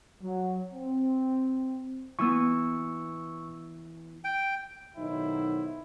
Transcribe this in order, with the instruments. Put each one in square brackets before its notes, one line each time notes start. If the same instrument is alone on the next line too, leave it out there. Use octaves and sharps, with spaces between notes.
[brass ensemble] F#3
C4
[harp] E3 B3 [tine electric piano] C#6 E6
[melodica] G5
[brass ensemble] B1 D#3 F#3 D#4 E4 C5